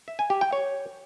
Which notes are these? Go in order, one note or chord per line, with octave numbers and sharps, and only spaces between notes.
E5
G#5
G4
G5
C#5